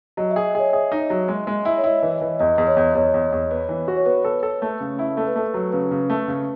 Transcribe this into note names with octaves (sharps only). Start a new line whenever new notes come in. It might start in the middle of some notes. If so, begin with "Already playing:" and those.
F#3 D#5
E5
G#4
D#5
G#4 C#5
G#4 E5
D#4
F#3
G#3
G#3
E4
C#5
E4 D#5
E3
E5
E3
E2 D#5
E2
C#5
E2
E2 C#5
E2
E2
B3
E3
F#4
C#5
B3 B4
A4
A4
A3
C#3
E4
A3 A4
B4
A3 A4
F#3
C#3 B4
C#3
A3
C#3